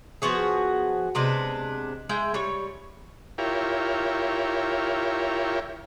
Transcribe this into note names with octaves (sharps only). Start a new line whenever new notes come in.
F3 B3 F#4 G#4
C3 G#3 B3 D4
G#3 E4 G5
G3 C#5
E4 F4 G4 A#4 C#5